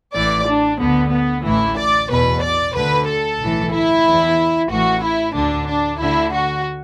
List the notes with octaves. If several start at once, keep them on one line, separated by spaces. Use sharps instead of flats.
A1 A2 E3 D5
D4
D2 D3 B3
B3
A1 A2 E3 E4
D5
E2 B2 B4
D5
D2 D3 B4
A4
B1 A2 E3
E4
E2 E3
A1 A2 E3 F#4
E4
D2 D3 D4
D4
D2 D3 E4
F#4